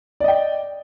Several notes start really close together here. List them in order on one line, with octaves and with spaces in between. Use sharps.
D5 D#5 G5